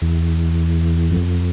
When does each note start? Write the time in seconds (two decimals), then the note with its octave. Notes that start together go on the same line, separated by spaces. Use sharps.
0.02 E2
1.11 F2